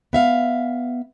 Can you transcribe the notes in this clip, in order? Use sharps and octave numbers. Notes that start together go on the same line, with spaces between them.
B3 E5 F5